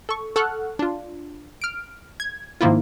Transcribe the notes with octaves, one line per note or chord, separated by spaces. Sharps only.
A4 C#6
A4 F#5 C#6 F6 F#6
D4 F4
F6 D7
G#6
G#2 D#3 F3 A#3 E4 F4